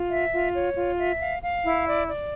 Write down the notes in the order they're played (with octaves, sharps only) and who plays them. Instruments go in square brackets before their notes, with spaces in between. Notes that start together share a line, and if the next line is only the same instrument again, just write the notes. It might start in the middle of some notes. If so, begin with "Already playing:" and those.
Already playing: [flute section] F4
E5
F4
C#5
F4
E5
F5
F5
E4
D5
D5